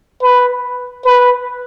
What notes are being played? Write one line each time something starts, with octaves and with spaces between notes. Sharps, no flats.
B4
B4